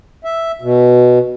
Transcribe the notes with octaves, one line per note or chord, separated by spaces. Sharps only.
E5
B2